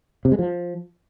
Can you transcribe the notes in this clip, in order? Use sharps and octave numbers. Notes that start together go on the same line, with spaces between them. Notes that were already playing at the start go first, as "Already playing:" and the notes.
C3
G#3
F3